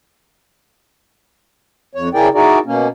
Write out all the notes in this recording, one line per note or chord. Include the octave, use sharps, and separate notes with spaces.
F2 C#5
C#3 E4 G#4 A#4 D5 G5
D#4 E4 F#4 G#4 A#4 D5
B2 A#3 C#4